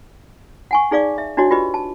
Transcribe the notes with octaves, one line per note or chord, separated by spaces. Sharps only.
F#5 G#5 C#6
D#4 G#4 D5 F5 D6
E5
D4 E4 F#4 C#5 D#5
F4 G4 B4 D#5
A5